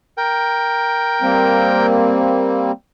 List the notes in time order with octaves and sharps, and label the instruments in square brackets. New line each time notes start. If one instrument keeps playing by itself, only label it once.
[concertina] A#4 G5
[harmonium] G3 A#3 C4